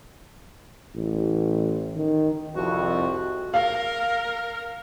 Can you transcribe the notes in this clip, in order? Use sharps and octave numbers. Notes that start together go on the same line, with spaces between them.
A1
D#3
C2 F2 F#4
A#4 F5